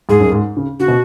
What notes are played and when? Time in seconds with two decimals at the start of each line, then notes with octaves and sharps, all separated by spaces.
0.09 G#2 G#4
0.20 F#2
0.32 G#2
0.57 C#3
0.80 C#3 F#4
0.88 B2